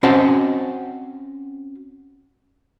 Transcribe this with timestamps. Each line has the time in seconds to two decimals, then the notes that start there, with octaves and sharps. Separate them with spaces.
0.03 C4 C#4 F#4 C5 D#5 A5